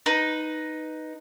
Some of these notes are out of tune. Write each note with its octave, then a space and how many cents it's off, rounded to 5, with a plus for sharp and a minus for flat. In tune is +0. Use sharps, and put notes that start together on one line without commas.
D#4 +0 B4 +0